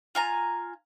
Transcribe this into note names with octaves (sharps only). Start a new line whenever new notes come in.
F4 G#5 A#5